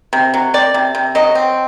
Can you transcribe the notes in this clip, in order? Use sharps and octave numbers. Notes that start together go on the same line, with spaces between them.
C3
F#3
C4 D5
C3
C3
F#3 D#5
C4